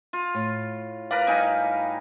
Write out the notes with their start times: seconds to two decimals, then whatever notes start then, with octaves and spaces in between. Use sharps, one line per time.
0.13 F4
0.35 A2
1.11 A#4 B4 D5 F5
1.27 G3 D#4 G#5